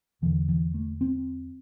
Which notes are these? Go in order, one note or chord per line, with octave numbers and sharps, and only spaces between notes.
E2 D3 E3
E3
A3
C4